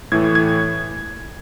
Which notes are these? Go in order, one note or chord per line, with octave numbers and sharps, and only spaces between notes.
A2 E3 A3 G#6
G#6